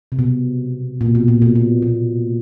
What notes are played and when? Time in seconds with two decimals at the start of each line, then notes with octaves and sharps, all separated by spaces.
0.12 C3
0.19 B2
1.01 A#2
1.15 B2
1.28 A#2
1.42 B2
1.55 B2
1.82 B2